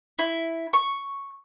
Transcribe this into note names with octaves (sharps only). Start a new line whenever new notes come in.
E4
C#6